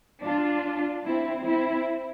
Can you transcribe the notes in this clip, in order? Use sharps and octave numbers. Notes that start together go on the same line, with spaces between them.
D4 F4
C4 E4
C4 E4